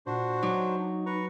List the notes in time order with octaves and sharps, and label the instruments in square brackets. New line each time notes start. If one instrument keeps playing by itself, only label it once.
[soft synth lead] A#2 [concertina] D4 F#4 C5
[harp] F#3 D6 [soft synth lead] D#4
[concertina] B4 A#5 C#6